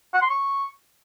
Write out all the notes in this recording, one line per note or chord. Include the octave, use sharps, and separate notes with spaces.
F#5
C6
C#6